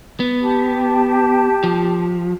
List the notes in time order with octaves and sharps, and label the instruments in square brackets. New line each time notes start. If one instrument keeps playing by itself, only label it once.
[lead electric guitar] B3
[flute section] G4 A5
[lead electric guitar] F3